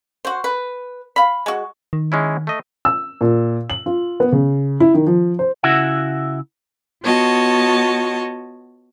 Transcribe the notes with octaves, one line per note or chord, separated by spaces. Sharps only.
F#4 C5
B4
F5 B5
G#3 F#4
D#3
G#3 C#4 E4
A3 D#5
E6
A#2
F#7
F4
B3
C#3
E4
D#3
F3
C5
C#3 E4 F#4 E5 F#5
B3 F4 F#4 C#5 D#5 A5